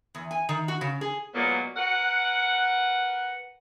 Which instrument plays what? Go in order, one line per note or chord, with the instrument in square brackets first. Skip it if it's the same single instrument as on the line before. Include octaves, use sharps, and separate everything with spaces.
[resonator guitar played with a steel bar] E2
G#5
D#3
F#4
C#3
G#4
[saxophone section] A#2 F#3 G#3 A#3 B3
A#4 B4 F#5